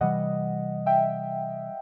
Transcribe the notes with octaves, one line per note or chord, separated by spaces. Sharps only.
C3 E3 G3 D#5 F#5
E5 G5